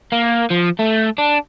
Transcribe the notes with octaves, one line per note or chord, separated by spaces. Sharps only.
A#3
F3
A3
D4